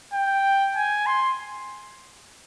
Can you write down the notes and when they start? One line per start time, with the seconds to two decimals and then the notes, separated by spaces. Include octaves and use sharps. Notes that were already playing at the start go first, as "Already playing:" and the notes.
0.14 G5
0.75 G#5
1.06 C6